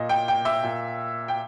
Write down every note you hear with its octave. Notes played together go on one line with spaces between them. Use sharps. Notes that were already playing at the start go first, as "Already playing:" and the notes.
Already playing: A#2 D#5
G5
G5
E5
A#2
G5